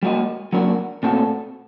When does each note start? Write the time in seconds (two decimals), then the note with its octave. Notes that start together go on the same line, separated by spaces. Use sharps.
0.03 G3 A#3 F#4 A#4 D#5
0.53 F#3 A#3 D4 F#4 A#4
1.03 A#2 A3 C4 F#4 A4